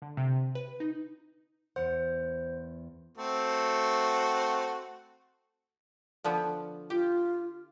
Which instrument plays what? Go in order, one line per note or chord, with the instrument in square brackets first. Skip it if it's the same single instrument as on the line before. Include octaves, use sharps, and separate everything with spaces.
[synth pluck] D3
C3
B4
D#4
[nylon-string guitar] E2 F#5 [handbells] C5
[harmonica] A3 C4 F#4
[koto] D3 F3 B3
[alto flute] F4 [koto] G4